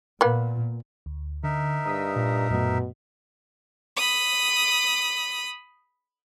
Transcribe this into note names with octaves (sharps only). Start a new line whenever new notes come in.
A#2 A#3 B3
D2
D3 D#4 A#4 E5
G2 A#5 D#6 B6
A#2
F#2 B2 A3
B5 D#6